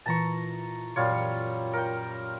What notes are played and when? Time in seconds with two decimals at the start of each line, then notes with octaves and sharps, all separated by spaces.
0.06 A#2 E3 A5 A#5 C#6
0.96 F#2 A#2 G3 F4 C#5
1.73 A#4 G5 C#7